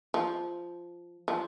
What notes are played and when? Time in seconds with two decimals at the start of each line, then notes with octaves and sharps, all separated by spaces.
0.14 F3
1.28 F3